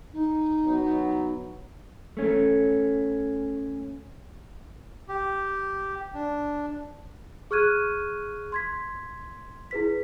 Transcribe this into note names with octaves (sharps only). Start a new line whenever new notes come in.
D#4
F#3 B3
A3 C#4
G4
D4
G#4 C#6 F6 F#6 G#6 D#7
C6 G#6 B6
E4 G#4 B4 B6